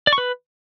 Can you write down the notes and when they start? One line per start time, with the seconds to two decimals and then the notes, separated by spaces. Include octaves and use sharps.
0.07 D5
0.13 C#6
0.18 B4